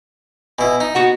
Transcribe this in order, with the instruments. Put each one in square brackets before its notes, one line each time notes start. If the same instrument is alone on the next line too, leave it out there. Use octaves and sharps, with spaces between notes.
[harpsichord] B2 E4 [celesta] G#5
[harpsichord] D#4 [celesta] D#5
[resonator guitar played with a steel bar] B3 F#4 F#5